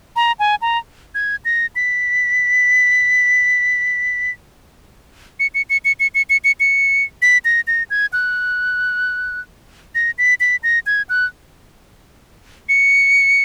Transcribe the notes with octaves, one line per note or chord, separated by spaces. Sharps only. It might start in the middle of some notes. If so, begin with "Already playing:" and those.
A#5
G#5
A#5
G#6
A#6
B6
C#7
C#7
C#7
C#7
C#7
C#7
C#7
C#7
C#7
B6
A#6
A#6
G#6
F#6
A#6
B6
B6
A#6
G#6
F#6
C#7